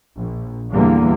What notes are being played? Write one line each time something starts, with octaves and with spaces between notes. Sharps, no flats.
A#1
E2 D3 G3 A#3